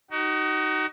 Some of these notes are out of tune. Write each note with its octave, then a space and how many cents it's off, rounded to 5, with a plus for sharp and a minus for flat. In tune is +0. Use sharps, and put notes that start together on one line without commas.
D#4 +0 F#4 +35